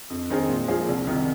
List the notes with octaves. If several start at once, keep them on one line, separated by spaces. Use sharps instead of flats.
F2
D#3 C4 D#4 G#4
A#2
F3 A#3 G#4
C2
C3 D#3